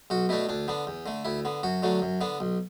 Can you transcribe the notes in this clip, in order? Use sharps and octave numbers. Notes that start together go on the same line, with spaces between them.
B1 F#4
B2 A3 D4 E4
D2 D4
D3 B3 D4
E2
D3 A3
D2 E4
D3 B3
F#2 F#4
D3 F#3 A3 D4
F#2
D3 B3 D4
B1